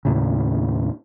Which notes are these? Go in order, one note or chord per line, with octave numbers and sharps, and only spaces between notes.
D#2 A2 C#3